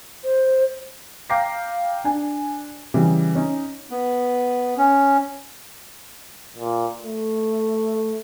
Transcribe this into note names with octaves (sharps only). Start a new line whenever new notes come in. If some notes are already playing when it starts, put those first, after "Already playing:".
C5
F5 G5 A#5 D6 A#6 C7
D4 G#5
C#3 E3 G3 C#4
C#4 D#4
B3
C#4
A#2
A3